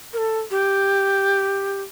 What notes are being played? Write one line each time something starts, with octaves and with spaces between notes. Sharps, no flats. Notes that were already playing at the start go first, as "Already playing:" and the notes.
A#4
A4
G4